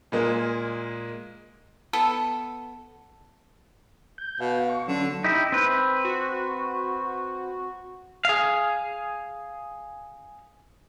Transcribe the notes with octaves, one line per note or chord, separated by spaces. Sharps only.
A#2 G#3 A#3
B3 A4
G6
B2 F5
C#6
D3 F#3 C#4
D#4 E4 G4
C4 B4
F#4
G#4 F5